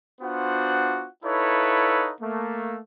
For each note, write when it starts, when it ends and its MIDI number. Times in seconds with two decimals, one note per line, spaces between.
0.21 1.07 59
0.21 1.07 62
0.21 1.07 65
0.21 1.07 66
0.21 1.07 72
0.21 1.07 78
1.24 2.12 63
1.24 2.12 64
1.24 2.12 69
1.24 2.12 71
1.24 2.12 73
1.24 2.12 77
2.21 2.78 57
2.21 2.78 58